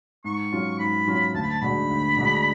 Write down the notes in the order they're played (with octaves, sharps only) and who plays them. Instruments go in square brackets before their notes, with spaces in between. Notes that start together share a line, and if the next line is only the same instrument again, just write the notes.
[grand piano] G#2 [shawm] C#6
[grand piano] F#3 C#4 F4
[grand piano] G#2 [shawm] B5
[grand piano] F#3 C#4 F4
[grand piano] D2 [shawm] A5
[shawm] B5
A5
[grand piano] D3 G#3 D4 F#4 [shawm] B5
[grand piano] D2
D3 G#3 D4 F#4